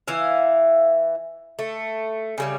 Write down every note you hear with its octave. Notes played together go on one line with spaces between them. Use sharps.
E3 E4 F5
A3
C#3 G3 C#5